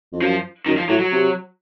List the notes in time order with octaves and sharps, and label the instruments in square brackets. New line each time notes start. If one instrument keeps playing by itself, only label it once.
[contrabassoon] F2
[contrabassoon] F#2 [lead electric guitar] F3
[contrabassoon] F#2 [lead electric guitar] D#3
[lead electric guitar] F3
[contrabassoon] A2 [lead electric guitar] F#3
[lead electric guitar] F#3
[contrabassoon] C3